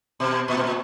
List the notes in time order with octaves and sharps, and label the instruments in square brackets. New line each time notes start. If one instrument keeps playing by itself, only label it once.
[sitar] B2
A#2
B2
A#2